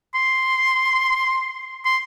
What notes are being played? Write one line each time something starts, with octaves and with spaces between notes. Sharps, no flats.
C6
C6